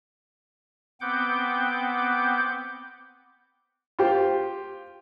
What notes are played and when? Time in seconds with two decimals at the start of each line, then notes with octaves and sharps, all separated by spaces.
1.01 B3 C4 F#5 G5 D6 G6
3.99 F4 G4 C5